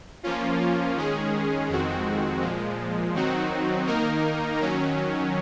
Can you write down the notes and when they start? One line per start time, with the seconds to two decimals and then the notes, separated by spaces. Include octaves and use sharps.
0.23 F3 A#3 C#4 F4
0.95 D#3 G#3 C#4 G#4
1.69 F2 D#3 G#3 C4 F#4
2.42 A#2 F3 G#3
3.14 D#3 F#3 C4 D#4 F#4
3.87 D#3 A#3 D#4 A#4
4.60 D#3 F#3 C#4